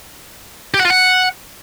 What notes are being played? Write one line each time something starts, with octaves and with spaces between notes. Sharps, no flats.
G4
F#5
F4
F#5